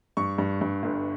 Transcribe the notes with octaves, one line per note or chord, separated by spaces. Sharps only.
G2 C#6
G2
G2
G1